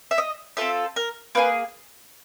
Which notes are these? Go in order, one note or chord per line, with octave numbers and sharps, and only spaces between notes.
E5
D#5
C4 F4 A4 E5
A#4
A#3 D#4 G#4 B4